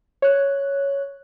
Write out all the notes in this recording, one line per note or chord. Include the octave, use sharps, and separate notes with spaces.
C#5 F#6